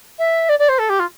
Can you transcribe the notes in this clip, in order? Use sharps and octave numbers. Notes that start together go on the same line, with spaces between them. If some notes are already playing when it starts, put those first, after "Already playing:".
E5
D5
D5
C5
A4
G4
F4